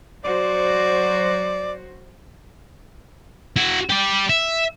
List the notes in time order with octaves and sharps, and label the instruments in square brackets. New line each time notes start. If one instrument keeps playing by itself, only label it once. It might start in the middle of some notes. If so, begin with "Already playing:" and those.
[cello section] F#3 F#4 C5 [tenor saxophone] D5
[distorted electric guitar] E4 F#4
G4 D5
E5